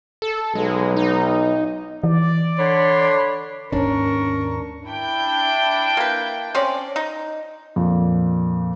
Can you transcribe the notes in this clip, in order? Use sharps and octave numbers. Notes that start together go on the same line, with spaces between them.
A4
B1 G#3
D#4
E3 D5
D3 C#5 B5 C6
D#2 G#2 C#4 D4 A#4 C#6
D4 E4 G5
A#3 B4
C4 C#4 D5
D#4
F2 A#2